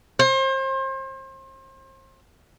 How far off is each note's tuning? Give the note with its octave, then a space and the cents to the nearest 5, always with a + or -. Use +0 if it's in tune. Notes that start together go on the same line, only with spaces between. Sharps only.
C5 +35